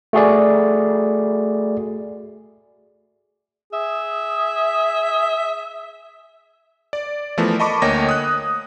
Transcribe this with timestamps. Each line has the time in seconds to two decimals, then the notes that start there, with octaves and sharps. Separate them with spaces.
0.13 A3 F#4 G#4 D5
3.73 G#4 E5
6.93 D5
7.37 E3 F3 A3 B3 A#4
7.60 D#5 A5 B5 C#6 D6
7.82 D2 A#3 C#5 D#5 G5 A#6
8.09 D#6 F#6